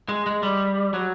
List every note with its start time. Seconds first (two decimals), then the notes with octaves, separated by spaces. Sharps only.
0.09 G#3
0.26 G#3
0.43 G3
0.94 F#3